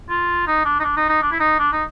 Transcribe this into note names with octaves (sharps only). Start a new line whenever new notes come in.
F4
D#4
D4
D#4
D4
D#4
D#4
D4
E4
D#4
D4
D#4